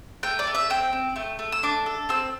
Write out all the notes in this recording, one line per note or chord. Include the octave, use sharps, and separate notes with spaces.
A3 G5
D5
A3
E5
C4 G5
C4
A3
A3
E6
D4 D6
A4
C4 E6